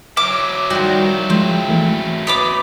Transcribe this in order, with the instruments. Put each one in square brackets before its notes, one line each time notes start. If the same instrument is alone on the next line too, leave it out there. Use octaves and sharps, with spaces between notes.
[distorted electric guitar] F#3 E4 [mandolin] D6 [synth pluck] F6
[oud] D#3 F3 G3 [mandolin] F#4
[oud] C#3 [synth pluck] F3 G#3 [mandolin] C4
[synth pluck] E3 A3
[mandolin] B3 B5 D6 [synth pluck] C#5 B6